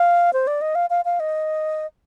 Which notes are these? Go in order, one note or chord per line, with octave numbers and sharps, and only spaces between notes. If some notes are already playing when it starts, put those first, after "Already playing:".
Already playing: F5
C5
D5
D#5
F5
F5
F5
D#5